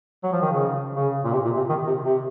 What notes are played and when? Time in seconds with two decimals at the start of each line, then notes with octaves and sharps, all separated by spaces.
0.23 F#3
0.32 F3
0.42 D#3
0.51 C#3
0.96 C#3
1.24 A#2
1.32 C3
1.45 A#2
1.57 C3
1.69 D#3
1.87 C3
2.05 C3